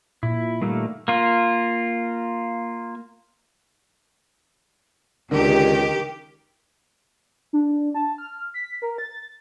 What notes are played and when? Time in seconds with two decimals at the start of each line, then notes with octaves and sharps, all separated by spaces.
0.23 A#2 E4
0.62 D#3 G3 A3 A#3
1.08 A#3 F4
5.31 C#2 D3 D#3 G4 A#4
7.53 D4
7.95 A5
8.18 F6
8.54 B6
8.82 A#4
8.98 A6